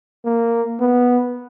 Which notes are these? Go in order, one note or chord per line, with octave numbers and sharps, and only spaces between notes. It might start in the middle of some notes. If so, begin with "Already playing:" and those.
A#3
B3